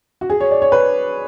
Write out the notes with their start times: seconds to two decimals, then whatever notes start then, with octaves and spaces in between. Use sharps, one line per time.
0.21 F#4
0.30 G#4
0.40 C#5
0.51 D5
0.62 C#5
0.72 B4